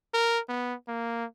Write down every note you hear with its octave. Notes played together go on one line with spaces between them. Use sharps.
A#4
B3
A#3